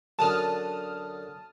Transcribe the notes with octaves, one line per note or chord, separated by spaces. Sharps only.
F#2 D3 A5 D#6 F6